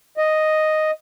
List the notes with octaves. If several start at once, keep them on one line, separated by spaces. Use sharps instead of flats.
D#5